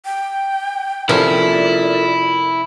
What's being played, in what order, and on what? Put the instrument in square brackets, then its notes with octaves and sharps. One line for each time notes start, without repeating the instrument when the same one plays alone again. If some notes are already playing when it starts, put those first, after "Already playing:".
[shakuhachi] G5
[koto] C3 F3 C#4 [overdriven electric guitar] E4 [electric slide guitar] F4 A4 A#4 [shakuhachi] D5